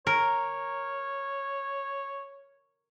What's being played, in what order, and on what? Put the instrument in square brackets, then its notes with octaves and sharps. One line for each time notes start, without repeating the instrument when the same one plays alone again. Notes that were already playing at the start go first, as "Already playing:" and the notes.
[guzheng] A#4 [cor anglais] C#5